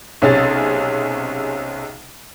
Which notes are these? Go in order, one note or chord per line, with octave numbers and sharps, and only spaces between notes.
B1 C3 C#4 G#4 A6